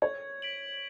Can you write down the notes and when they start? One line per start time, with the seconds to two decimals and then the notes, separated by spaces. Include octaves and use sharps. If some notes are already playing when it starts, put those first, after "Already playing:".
0.02 C#5 G#6
0.42 B6 D7 F#7